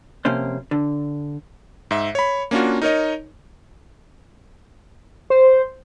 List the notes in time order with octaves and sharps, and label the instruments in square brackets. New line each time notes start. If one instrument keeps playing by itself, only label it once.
[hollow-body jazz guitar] F2 C3 A#3 C#4 C5
D3
[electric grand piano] G#2 E5
C#5 B5
A#3 C#4 D4 F4 F#4
D#4 A#4 C#5 D#5
[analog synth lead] C5